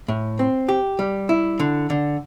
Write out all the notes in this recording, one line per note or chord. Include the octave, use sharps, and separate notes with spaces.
A2
C4
G4
G3
E4
D3
D3